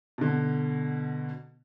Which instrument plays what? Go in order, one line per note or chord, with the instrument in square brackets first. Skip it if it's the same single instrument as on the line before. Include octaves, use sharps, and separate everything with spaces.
[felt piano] B2 D3